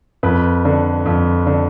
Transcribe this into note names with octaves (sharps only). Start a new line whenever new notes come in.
F2 B4
D3
F2
D3